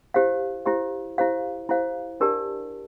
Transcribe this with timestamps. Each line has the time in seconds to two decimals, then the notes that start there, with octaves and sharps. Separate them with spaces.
0.14 E4 G4 C5 F5
0.65 E4 G4 C5 F5
1.18 E4 G4 C5 F5
1.69 E4 G4 C5 F5
2.20 D4 G4 A#4 D5 A5